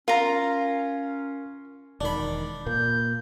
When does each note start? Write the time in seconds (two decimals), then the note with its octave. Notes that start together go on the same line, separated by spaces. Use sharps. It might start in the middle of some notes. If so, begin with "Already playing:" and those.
0.08 C#4 F4 A#4 A#5
2.01 E1 D#3 D4 B5
2.66 A#2 A#3 G6